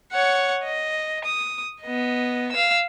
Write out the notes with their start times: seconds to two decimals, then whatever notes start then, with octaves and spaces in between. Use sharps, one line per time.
0.12 C#5 F#5
0.63 D#5
1.25 D#6
1.82 B3 D#5
2.52 F5 E6